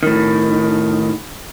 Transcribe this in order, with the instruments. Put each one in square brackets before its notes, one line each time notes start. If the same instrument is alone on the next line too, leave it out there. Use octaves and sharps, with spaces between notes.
[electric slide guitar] A2 D#3